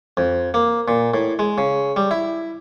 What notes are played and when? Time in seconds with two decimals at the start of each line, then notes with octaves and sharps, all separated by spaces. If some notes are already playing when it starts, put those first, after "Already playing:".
0.17 F2
0.54 A#3
0.88 A#2
1.14 A2
1.39 G#3
1.58 C#3
1.96 G3
2.11 E4